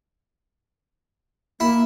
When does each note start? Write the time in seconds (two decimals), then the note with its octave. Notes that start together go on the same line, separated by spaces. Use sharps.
1.60 A#3 E4